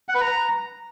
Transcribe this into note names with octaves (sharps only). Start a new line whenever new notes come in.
F#5
B4
A#5